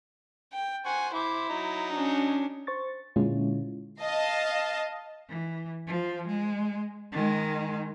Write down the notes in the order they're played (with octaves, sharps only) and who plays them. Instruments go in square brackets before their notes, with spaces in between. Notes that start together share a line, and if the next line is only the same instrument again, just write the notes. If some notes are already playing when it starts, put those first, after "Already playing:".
[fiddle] G5
[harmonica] C5 F#5 C#6 [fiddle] G#5
[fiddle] E4 [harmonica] C5 D6
[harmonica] F#3 D#4
[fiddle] C#4 D4
[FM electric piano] C5 C#6 A6
A#2 D3 G#3 C#4 E4 F4
[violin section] D#5 F5 A5
[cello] E3
F3
G#3
D#3 G#3